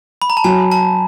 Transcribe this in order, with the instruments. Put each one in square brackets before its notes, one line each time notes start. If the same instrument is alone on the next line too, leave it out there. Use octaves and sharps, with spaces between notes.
[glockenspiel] B5
A#5
A5
[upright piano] F#3 [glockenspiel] G#5
[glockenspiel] A5